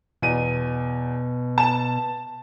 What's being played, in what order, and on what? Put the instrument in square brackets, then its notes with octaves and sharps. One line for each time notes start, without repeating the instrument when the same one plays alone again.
[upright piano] E2 D#7 [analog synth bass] B2
[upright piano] A5 E7